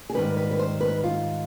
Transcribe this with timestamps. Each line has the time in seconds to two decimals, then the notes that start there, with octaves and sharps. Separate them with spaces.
0.10 G#4
0.14 G#2 D#3 G3 B4
0.37 B4
0.51 B4
0.59 C5
0.81 B4
1.04 F4